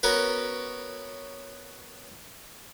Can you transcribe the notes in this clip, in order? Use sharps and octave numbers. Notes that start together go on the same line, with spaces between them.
B3 C#4 F#4 A#4 B4